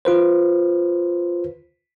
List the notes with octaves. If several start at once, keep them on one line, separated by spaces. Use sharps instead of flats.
F4 B4 C5